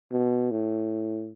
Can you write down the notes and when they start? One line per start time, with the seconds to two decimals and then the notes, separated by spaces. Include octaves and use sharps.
0.12 B2
0.51 A2